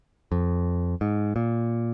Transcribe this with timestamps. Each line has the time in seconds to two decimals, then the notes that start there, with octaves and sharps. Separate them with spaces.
0.32 F2
1.01 G#2
1.36 A#2